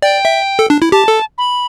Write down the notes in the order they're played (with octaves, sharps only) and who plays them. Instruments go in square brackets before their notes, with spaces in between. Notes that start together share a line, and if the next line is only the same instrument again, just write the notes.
[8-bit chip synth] D5 [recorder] G5
[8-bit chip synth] E5
A4
D4
E4
[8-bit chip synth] G4 [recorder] A5
[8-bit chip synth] A4
[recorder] B5